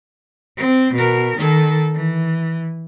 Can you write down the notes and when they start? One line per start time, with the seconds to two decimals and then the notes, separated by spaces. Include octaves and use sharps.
0.57 C4
0.94 B2 A#4
1.38 D#3 A4
1.95 E3